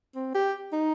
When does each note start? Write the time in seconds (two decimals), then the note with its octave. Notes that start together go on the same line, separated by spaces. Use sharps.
0.15 C4
0.35 G4
0.73 D#4